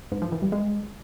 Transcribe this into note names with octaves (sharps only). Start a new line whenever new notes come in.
G#2
F3
E3
G3
G#3